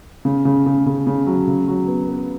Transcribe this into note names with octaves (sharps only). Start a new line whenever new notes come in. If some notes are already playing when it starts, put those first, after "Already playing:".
C#3
C#3
C#3
C#3
C#3
F#3
C#3
F#3
B3
B3